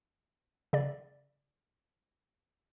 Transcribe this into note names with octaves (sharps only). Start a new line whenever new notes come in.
C#3 D5